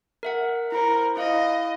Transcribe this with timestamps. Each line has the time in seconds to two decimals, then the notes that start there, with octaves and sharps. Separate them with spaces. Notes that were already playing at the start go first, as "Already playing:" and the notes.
0.23 A#4 E5 F#5
0.72 E4 A#4 C5
1.17 E4 D#5 F5